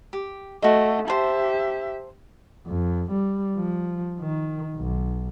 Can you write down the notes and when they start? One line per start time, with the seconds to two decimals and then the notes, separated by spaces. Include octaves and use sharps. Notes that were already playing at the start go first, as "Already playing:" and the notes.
0.13 G4
0.62 A3 F#4 D#5
1.08 G4 C5 E5 A5
2.67 F2
3.11 G3
3.57 F3
4.20 D#3
4.76 B1